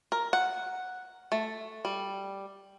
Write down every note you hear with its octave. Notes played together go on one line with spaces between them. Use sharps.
A#4
F#5
A3
G3